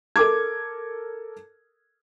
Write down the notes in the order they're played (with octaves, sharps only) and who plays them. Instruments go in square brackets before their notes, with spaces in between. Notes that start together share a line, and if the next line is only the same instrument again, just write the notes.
[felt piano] A4 A#4 D6 G#6